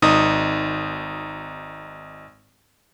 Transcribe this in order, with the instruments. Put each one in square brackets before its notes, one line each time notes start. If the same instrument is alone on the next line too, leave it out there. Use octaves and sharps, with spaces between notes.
[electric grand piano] G#1 D#4 D#6